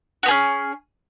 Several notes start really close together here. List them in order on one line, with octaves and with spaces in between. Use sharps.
F#4 B3 G#4 C#4